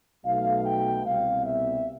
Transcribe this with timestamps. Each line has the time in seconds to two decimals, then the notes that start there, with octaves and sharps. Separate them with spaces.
0.25 B1 B2 A3 F5
0.65 G5
1.05 C2 B2 G3 F5
1.46 E5